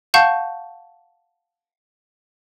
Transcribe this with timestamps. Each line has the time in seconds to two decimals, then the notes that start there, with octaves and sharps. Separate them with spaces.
0.14 F5 F#5 A5 C#6 G6